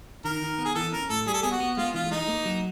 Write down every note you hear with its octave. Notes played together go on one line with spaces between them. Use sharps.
D#3 A#4
D#3
B3
G#4
E3 A4
C#4 A#4
A2 A4
G3 G#4
A4
B3 G#4
F#4
B3
G#3 F4
E3 F4
G#3 D#4
A#3
F#3